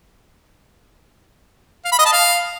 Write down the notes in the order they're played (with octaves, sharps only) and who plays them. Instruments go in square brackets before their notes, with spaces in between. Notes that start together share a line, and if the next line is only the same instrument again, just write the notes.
[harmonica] F5
B5
D#5
A5
F5